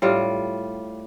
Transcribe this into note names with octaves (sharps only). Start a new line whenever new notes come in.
A2 G3 F4